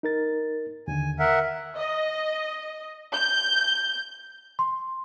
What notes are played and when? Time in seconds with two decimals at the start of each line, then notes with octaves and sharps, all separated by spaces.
0.03 D#4 A#4 A6
0.88 D#2 D3 G#5
1.19 A#4 E5 F#5
1.77 D#5
3.13 G6
4.59 C6